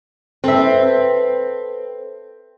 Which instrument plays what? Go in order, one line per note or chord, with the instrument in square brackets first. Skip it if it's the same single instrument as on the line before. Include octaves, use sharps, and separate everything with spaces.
[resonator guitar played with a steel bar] C4 [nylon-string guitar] A4 B4 E5